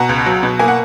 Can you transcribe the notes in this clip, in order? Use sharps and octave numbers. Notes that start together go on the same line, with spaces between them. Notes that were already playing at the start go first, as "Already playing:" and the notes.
Already playing: B2 F#5 A#5
C#2
F#3
B2
A#3 G#5
F#5